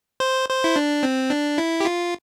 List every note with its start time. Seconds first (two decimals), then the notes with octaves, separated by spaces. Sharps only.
0.20 C5
0.49 C5
0.64 E4
0.76 D4
1.03 C4
1.30 D4
1.58 E4
1.81 G4
1.85 F4